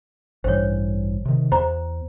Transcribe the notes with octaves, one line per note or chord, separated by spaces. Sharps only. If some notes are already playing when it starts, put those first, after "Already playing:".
A1 G2 E3 C5 C#5
C3 D#3
E2 C5 A#5